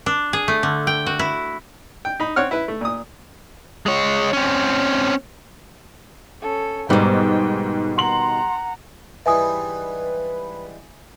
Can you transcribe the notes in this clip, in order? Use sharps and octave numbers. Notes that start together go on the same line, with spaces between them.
D4
G#4
A3
D3
G5
F#4
E4
G5
D#4 B5
C4 C#5 F#5 F6
E4 B4
A3
A#2 D#6
G#3 C#5
C4 C#4
C#4 A4
G#2 B2 D#3 G3 G5
F#5 A#5 C6 F#7
G#2 E3 G3 B4 E5 G#5 D#6